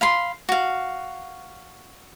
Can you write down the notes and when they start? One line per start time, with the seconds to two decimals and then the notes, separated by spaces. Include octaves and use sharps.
0.01 F5 B5 C6
0.49 F#4 F5